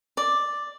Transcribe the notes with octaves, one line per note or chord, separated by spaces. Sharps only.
D5